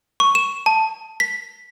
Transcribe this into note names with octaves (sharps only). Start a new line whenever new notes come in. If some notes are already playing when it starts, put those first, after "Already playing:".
C#6
E7
A5
B6